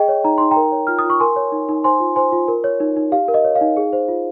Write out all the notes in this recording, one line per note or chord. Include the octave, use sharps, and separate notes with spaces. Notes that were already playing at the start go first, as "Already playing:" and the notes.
Already playing: G#4 D#5 G5
C#5
D#4 A#5
D#4 C6
G5 A#5
A#4
C#5
F4 F6
D#6
F4
C#6
A#4 G#5 C6
C#5
D#4
D#4
C5 G#5 C6
F4
C5 G#5 C6
F4
A#4
C#5
D#4
D#4
G4 F5
A#4
D#5
C#5
F5
D#4
G#4
C5
F4